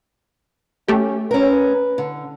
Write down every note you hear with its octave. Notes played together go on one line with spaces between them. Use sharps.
A3 C#4 G4
C#4 A#4 B4
D3